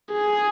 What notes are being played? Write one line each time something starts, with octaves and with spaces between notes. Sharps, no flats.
G#4